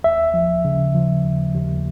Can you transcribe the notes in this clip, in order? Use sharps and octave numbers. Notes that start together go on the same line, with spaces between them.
D#2 E5
F3
C#3
F3
D#2
D#2